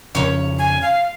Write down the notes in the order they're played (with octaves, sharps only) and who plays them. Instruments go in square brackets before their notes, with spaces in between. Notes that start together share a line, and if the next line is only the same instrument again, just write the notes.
[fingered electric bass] F2 C#3 F3 [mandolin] C#4 C#5
[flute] G#5
F5